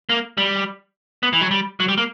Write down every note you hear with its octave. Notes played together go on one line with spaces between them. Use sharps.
A#3
G3
B3
E3
F#3
G3
F#3
G3
A#3